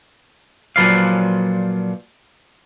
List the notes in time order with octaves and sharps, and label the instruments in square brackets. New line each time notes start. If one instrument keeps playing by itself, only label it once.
[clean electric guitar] A#2 F3 F#3 B4 D5 F5